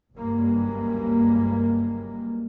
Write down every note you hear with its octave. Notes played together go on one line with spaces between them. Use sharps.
F#1 C#2 G2 G3 G#3 A#3